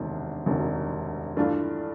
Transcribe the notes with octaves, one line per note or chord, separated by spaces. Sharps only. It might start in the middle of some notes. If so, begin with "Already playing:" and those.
Already playing: E1 D2 C3 D#3
E1 D2 C3 D#3
G2 E3 A3 D4 F4